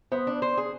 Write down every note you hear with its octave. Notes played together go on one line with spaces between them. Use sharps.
B3 C5
D4
C5
G#4